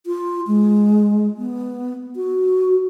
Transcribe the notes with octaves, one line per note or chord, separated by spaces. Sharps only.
F4
G#3
B3
F#4